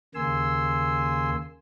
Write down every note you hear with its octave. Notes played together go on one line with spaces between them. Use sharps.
D#2 C#3 A#3 G#5 C6 E6